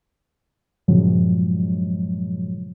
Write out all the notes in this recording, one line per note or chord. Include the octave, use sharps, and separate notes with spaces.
G2 A#2 C#3 F3 F#3 G#3